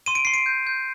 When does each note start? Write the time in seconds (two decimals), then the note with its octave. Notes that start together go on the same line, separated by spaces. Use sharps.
0.06 C6 D#7
0.15 D7
0.25 C6 C7
0.34 D7
0.46 G6
0.67 G6